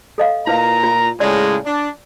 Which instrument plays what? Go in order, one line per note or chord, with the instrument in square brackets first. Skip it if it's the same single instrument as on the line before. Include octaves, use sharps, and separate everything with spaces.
[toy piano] A4 D#5 F5
[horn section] A#2 A#5 [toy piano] E4 B4 F5
[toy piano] F4
[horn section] A2 C#3 G#3 [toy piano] D5
[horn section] D4